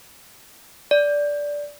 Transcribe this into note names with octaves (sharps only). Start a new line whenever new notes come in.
D5